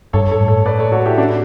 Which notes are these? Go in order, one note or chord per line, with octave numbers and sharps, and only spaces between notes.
G2 A4 C#5
A4 C#5
A2
A4 C#5
B4 D5
A4 C#5
F#4 A4
E4 G4
D4 F#4